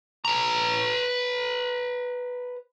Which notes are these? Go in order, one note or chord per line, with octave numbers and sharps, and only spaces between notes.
B4 A#5